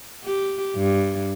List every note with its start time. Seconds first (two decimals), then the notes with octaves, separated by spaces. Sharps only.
0.24 G4
0.76 G2